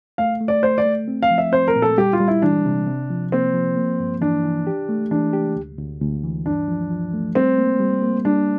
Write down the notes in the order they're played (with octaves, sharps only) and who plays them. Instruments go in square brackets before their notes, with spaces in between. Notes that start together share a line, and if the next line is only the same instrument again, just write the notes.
[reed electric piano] A3 [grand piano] F5
[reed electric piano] A3
[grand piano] D5
[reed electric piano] A3 [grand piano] C5
[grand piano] D5
[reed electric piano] A3
C4
[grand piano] F5
[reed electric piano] F3
[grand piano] E5
[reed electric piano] C4 [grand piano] C5
[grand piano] A#4
[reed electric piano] A#2
[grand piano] A4
[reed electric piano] G3 [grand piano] G4
[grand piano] F4
[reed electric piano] G3
[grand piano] E4
[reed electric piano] E3 [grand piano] D4
[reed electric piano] C3
C3
F3
[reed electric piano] A#3 [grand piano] C4
[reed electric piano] F3
A#3
G2
[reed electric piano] E3 [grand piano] D4
[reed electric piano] E3
G4
A3
[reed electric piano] E3 [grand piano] D4
[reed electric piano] G4
D2
D2
D2
E3
[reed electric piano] G2 [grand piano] D4
[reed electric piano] F3
F3
A3
[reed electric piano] G3 [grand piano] C4
[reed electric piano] A#3
G3
A#3
[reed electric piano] G3 [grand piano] D4